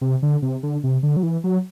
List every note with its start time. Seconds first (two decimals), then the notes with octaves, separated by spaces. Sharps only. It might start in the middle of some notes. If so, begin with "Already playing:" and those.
0.01 C3
0.23 D3
0.42 C3
0.63 D3
0.84 C3
1.03 D3
1.17 F#3
1.23 E3
1.44 F#3